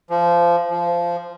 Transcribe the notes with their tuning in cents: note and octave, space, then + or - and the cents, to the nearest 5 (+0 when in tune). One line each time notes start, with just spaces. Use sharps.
F3 -20
F3 -15